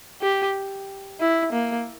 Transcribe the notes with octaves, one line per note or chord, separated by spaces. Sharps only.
G4
E4
A#3